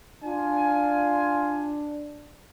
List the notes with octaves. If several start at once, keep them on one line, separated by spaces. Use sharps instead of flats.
D4 F4 G#5